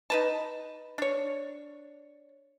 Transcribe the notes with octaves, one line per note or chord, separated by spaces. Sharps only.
D#4 B4 A5
D4 C#5